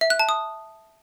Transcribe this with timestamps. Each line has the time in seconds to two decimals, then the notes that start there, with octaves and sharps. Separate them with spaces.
0.01 E5
0.10 F#6
0.19 A5
0.29 D#6